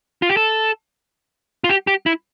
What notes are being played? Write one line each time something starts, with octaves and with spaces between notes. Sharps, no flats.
F4
G4
A4
F4
G4
G4
E4